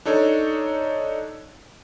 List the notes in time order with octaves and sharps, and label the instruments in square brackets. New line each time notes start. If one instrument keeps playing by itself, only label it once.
[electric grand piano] D4 D#4 A4 C#5